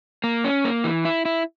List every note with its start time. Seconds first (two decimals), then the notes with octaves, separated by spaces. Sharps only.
0.24 A#3
0.44 C#4
0.65 A#3
0.84 E3
1.05 E4
1.25 E4